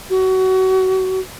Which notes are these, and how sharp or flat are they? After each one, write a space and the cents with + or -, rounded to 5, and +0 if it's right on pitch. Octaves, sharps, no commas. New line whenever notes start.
F#4 +25